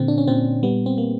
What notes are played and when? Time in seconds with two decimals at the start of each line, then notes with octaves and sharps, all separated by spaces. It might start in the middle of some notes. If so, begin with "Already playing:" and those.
Already playing: A#2 D3 C4
0.08 D4
0.18 C#4
0.27 A#2 C4
0.63 G3 B3
0.86 C4
0.98 A#3